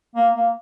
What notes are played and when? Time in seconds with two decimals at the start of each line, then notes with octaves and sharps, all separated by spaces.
0.15 A#3
0.34 A#3